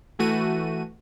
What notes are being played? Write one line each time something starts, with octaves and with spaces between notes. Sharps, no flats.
E3 A3 F#4 D#7